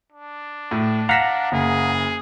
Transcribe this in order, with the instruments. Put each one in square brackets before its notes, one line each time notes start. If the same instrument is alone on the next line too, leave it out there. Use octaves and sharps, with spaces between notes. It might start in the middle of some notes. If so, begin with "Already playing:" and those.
[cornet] D4
[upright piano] A2
[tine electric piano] F5 F#5 A#5 [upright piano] A#6 B6 E7
[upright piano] F#1 [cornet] G#4